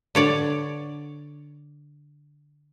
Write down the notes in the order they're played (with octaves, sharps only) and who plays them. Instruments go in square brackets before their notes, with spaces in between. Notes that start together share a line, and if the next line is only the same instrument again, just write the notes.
[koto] D3 C#5 D5